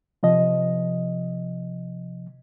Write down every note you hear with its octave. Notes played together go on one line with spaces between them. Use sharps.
C3 F3 D#5